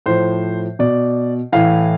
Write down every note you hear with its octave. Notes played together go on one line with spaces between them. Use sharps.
A2 F3 C5
B2 D5
A2 E3 F5